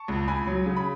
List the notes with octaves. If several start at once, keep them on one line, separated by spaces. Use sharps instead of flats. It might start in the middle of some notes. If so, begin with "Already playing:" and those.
Already playing: A5 C#6
C#2
C#2 G#5 B5
F#3
C#3
B5